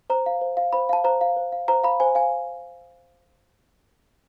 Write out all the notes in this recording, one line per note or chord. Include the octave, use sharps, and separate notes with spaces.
C5 A#5
F5
C5
F5
C5 B5
F5 A5
C5 A#5
F5
C5
F5
C5 A#5
F5 B5
C5 G#5
F5 G#5